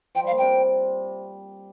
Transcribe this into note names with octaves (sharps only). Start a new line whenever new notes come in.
F3 G5
G3 F5
A#2
C3 G5